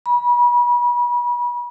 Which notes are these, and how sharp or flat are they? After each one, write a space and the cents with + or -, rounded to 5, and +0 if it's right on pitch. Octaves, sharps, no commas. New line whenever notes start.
B5 -35